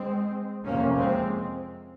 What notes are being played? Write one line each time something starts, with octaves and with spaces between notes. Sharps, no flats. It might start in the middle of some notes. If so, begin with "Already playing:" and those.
Already playing: G#3 C4
F2 C3 A#3 C#4
G#3 C4